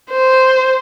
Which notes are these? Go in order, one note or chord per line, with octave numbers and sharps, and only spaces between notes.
C5